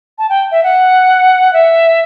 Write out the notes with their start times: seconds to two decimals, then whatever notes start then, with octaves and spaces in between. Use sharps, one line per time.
0.18 A5
0.29 G5
0.52 E5
0.63 F#5
1.53 E5